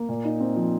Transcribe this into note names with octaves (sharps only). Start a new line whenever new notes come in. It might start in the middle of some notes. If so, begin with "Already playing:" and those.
Already playing: A#3
A#2
D#4
C4
F3